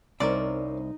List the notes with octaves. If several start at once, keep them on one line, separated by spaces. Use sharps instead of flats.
C2 C4 C#4 D#4 A#4 D5